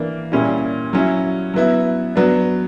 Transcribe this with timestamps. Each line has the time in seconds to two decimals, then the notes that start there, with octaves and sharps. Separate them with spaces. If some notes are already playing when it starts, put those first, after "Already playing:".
Already playing: E3 A#3 D4
0.32 A#2 G3 C#4 E4
0.93 F#3 C#4 E4
1.54 F#3 B3 E4
2.16 F#3 B3 D4